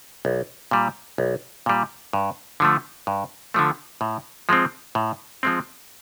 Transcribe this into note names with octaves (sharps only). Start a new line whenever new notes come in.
B1
A#2 G3
B1
A#2 G3
G2
D3 F3 A3
G2
D3 F3 A3
A2
F3 G#3 C4
A2
F3 G#3 C4